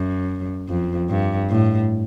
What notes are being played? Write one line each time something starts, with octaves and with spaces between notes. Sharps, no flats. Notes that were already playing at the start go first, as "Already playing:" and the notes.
Already playing: F#2
F2
G2
A2